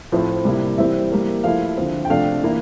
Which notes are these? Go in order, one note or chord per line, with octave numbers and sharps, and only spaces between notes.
A2 F3 C4 E4
C3 G3 A#3 E4
E3 G3 C4 E5
E3 G3 A#3
F3 A3 E4 F5
D3 F3 C4
G5
C3 F3 A3 D4 F5
E3 A#3 E4